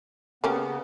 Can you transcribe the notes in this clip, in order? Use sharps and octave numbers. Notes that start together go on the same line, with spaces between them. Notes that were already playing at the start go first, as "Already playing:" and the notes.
C#3 A#3 B3 C#4 G4